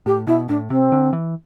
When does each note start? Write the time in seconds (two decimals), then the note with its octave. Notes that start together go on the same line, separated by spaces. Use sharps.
0.06 A2 G4
0.27 B2 E4
0.49 A2 D4
0.70 C3 C4
0.92 D3
1.13 E3